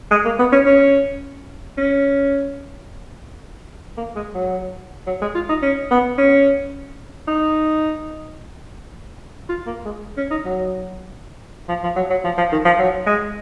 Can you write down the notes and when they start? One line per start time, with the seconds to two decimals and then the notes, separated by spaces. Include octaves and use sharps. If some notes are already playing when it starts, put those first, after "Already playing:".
0.11 G#3
0.25 A#3
0.39 B3
0.52 C#4
0.66 C#4
1.77 C#4
3.97 A#3
4.16 G#3
4.34 F#3
5.07 F#3
5.22 G#3
5.35 F4
5.49 D#4
5.62 C#4
5.91 B3
6.18 C#4
7.27 D#4
9.49 F4
9.66 A#3
9.85 G#3
10.17 C#4
10.31 D#4
10.45 F#3
11.68 F3
11.83 F3
11.96 F#3
12.10 F#3
12.24 F3
12.38 F3
12.52 D#3
12.65 F3
12.79 F#3
13.06 G#3